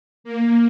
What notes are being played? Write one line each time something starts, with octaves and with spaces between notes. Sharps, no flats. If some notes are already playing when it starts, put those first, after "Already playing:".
A#3